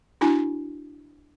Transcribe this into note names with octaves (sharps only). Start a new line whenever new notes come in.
D4 E4 F#4 G#5